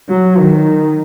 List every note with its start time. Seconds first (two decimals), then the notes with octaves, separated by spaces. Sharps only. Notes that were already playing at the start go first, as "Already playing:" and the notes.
0.09 F#3
0.39 D#3